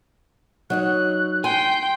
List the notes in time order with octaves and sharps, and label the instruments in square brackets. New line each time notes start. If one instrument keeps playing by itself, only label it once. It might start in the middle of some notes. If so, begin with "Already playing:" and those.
[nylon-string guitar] F#3 D#4 C#5 [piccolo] F#6
[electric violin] G5 [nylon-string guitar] G#5 [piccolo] C6